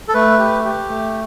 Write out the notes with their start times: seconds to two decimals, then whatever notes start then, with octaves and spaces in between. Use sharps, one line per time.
0.08 A4
0.14 A3 B4
0.39 G4
0.65 G4
0.89 A3